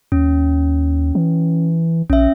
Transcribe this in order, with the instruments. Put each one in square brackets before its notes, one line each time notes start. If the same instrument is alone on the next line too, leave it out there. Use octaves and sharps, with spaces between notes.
[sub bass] D#2 [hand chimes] C#4
[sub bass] E3
[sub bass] A#1 [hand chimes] C#4 E5